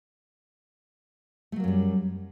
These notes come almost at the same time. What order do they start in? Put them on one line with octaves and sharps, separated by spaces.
A3 F#3 A#3 F#2 G3